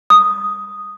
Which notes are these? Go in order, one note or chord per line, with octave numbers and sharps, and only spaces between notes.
D#6